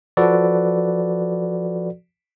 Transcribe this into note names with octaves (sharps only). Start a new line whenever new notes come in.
F3 F#4 A4 B4 D5